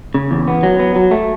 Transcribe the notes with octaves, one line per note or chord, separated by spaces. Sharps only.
C#3
E2
B3
F#3
B3
F#3
A3